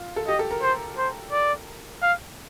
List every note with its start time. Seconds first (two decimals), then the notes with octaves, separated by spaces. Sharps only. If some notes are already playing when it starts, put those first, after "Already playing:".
Already playing: F4
0.16 A4
0.28 G4 D#5
0.39 A4
0.51 A#4
0.62 C5
0.98 C5
1.32 D5
2.02 F5